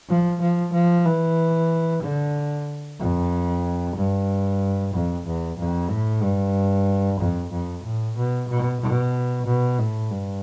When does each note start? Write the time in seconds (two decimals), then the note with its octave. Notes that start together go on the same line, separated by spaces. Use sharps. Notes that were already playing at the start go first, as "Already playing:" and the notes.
0.09 F3
0.41 F3
0.73 F3
1.05 E3
2.02 D3
2.99 F2
3.96 G2
4.94 F2
5.26 E2
5.58 F2
5.90 A2
6.22 G2
7.20 F2
7.51 F2
7.84 A2
8.17 B2
8.49 B2
8.81 B2
9.46 B2
9.78 A2
10.10 G2